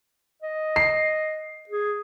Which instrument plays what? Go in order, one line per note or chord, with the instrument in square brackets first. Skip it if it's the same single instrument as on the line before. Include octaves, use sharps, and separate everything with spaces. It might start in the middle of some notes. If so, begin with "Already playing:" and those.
[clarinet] D#5
[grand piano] C7
[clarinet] G#4